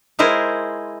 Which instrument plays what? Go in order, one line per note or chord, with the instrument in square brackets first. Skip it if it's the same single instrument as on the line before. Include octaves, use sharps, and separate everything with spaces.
[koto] G#3 E4 G#4 A#4 C5